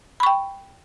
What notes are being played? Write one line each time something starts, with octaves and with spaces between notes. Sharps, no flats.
G5 B5 C#6